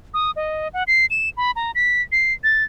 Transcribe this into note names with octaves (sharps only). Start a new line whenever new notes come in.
D#6
D#5
F#5
C7
E7
B5
A#5
B6
C7
A6